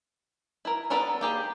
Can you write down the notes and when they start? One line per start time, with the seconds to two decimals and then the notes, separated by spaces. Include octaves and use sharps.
0.65 E4 A#4
0.90 B3 D4 A4 A#4 B5
1.21 A#3 G4 G#4